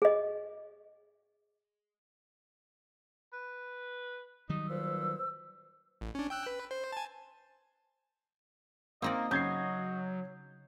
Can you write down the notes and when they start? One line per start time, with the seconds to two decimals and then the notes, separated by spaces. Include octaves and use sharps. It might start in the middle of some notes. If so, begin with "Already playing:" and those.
0.02 G#4 D#5
3.33 B4
4.49 D#3 F#3 G3 D#4
4.69 A#2 B4 C5 E6
6.01 A1
6.15 C#4 D4
6.30 G5 E6 F#6
6.46 B4
6.71 C5
6.92 G#5 A5
9.02 A#3 C4 D#4 D5 D#5
9.31 C#3 F#3 G6 G#6 C7